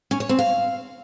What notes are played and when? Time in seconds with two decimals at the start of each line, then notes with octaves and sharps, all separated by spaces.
0.11 C#4
0.20 C#5
0.29 C4
0.39 F5